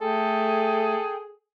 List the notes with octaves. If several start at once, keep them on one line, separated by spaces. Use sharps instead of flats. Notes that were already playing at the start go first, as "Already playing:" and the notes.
A3 G#4 A4 G5